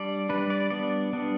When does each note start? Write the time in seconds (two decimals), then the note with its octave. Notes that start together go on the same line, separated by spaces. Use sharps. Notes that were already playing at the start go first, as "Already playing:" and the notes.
Already playing: G3 D4 D5
0.29 G3 D4 B4
0.50 D5
0.70 G3 B3 D4 D5
1.13 G3 B3 D4